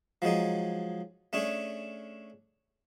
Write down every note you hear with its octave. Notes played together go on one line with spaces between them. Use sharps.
F3 F#3 G#3 D#4
A3 C#4 D4 G#4